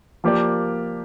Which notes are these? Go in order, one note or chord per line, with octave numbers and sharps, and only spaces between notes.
F3 A#3 G4 A#4 D5